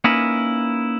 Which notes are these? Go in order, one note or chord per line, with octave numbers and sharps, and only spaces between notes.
A#3 C#4 D#4 E4 A#4 B4